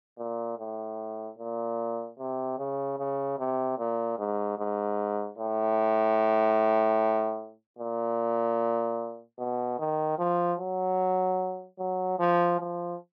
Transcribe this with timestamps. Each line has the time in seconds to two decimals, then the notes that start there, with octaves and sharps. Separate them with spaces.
0.18 A#2
0.58 A2
1.38 A#2
2.18 C3
2.58 C#3
2.98 C#3
3.39 C3
3.78 A#2
4.18 G#2
4.58 G#2
5.38 A2
7.79 A#2
9.38 B2
9.79 D#3
10.19 F3
10.60 F#3
11.79 F#3
12.19 F3
12.60 F3